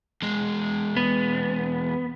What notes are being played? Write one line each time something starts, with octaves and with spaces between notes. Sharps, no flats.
E2 G#3
B3